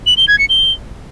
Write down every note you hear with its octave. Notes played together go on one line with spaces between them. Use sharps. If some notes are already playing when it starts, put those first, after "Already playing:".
F#7
G7
G#6
C#7
G7